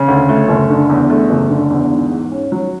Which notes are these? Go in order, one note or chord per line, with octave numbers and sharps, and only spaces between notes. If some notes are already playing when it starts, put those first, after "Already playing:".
Already playing: C#3
D2
A3
F#1
D3
E2
A3
F#1
D3
E2
G#2
G#2
C#4
F#3